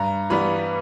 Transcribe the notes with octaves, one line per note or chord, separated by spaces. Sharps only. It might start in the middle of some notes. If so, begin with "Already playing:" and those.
Already playing: G2 A#5
E3 G3 B3 B5